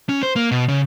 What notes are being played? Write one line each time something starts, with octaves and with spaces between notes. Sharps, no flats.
C#4
C5
A#3
B2
C#3